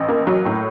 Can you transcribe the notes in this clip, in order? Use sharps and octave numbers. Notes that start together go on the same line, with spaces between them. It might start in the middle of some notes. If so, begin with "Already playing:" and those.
Already playing: A1
A#3
F#3
A2